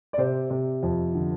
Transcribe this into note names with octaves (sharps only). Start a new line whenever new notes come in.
D5
C3 C5
C3
F2
D3